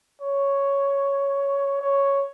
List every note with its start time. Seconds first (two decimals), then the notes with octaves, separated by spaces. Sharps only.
0.21 C#5
1.81 C#5